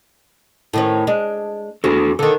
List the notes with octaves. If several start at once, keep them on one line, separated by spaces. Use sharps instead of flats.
A2 D#3 C#4
G#3 D4
E2 D4 F#4 A4
D3 D#3 A4